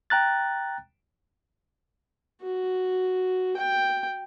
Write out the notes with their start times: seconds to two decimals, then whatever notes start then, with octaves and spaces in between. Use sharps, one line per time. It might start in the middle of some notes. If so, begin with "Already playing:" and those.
0.10 G5 A#5 F#6 A6
2.42 F#4
3.57 G5